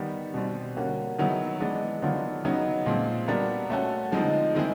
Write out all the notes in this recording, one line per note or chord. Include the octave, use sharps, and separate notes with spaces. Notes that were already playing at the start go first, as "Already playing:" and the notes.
Already playing: D#3 G3 B3
B2 G3 C4
D3 G3 A#3 C#4 F#4
D#3 F#3 B3 E4 G#4
E3 G#3 B3 D4
D#3 F#3 B3 D4 F4
C#3 F#3 B3 D#4 F#4
A#2 F3 G#3 C4
G3 B3 D4 F#4 A#4
A3 C#4 F#4 A4
D3 F3 G#3 C4 D#4
D#3 G#3 C4 E4 G#4